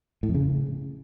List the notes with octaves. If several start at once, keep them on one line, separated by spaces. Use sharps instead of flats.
A2
F2
C#3